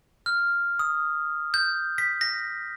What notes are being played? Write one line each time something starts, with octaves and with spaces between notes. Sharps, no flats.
F6
D#6
G6
B6
A#6